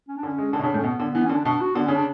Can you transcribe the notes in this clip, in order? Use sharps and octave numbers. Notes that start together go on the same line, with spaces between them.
C#4
D4
D3
C#4
G#3
D3 D4
B2
C#3
A2
C#4
B2 B3
D3
E3 B3
D3 C#4
D4
B2 D4
F#4
D3 B3
C#3 C#4
D4